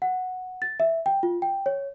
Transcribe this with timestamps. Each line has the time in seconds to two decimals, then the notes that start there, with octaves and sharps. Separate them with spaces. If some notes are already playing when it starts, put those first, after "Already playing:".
0.02 F#5
0.62 A6
0.80 E5
1.06 G5
1.23 F4
1.42 G5
1.66 C#5